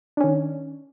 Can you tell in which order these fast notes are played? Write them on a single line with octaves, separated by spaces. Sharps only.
D4 C#4 D#3